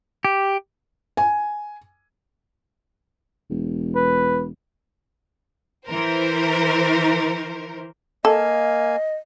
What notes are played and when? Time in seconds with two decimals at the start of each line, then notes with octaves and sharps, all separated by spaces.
0.25 G4
1.17 G#5
3.51 E1
3.96 B4
5.88 E3 A#4 C5
8.25 A#3 A4 D#5 F5 G#5